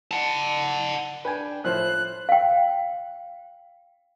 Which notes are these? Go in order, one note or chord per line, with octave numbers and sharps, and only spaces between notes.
F#5 A5
D4 B4 G5 G#5
A2 F3 C5 F#6
F5 G5